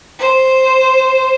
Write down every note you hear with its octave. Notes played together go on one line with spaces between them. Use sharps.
C5